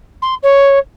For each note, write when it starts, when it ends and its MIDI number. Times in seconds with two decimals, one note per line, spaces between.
0.22 0.34 84
0.43 0.79 73